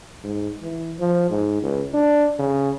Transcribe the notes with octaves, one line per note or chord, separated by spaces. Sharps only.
G#2
E3
F3
G#2
C#2
D4
C#3